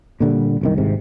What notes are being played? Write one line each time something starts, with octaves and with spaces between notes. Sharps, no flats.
A#2 D3 D#3 G3
F#1 C2 D#3
G#1 G#2 C3